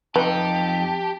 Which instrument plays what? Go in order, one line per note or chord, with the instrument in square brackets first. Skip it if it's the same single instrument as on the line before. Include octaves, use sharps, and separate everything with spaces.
[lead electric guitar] F2 D#4 [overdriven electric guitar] G4 [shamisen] B4 [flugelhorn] A5